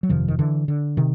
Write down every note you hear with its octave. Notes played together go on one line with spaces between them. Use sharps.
F#3
G1 F2 C3 D#3 F3
D#3
D3 E3
D3
C3 D#3